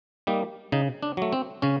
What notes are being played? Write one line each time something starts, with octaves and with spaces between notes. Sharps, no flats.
G3 A#3 D#4
C#3 D#4
D4
F#3 A3
C4
C#3 C#4